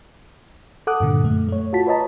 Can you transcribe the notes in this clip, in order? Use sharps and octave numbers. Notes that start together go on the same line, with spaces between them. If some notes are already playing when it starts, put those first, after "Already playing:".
A4 F#5 D6 D#6 F#6
G2 A#2 D3
F#2 A3
A3 C#5
F4 F#4 A5 B6
B4 C#5 D#5 A5 A#5